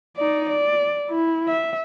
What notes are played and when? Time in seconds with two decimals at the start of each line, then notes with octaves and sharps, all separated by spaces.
0.17 D#4 D5
0.50 D5
1.10 E4
1.48 E5